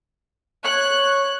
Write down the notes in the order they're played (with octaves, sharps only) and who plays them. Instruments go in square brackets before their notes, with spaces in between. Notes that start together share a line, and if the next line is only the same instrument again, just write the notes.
[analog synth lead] C#5 [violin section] F#6